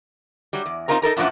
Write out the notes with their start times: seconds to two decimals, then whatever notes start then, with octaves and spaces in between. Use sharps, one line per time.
0.53 F#3 G3
0.66 E2
0.88 C4 D#4 F4 A#4 A#5
1.02 D#4 A4 A#4 A#5
1.17 F#2 A#2 E3 F3 D4 F#5